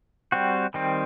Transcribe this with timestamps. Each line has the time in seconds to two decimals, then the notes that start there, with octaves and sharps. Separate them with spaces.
0.32 G3 C4 F#4
0.74 D#3 G3 C4